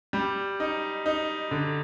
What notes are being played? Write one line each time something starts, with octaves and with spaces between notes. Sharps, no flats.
G3
D#4
D#4
D3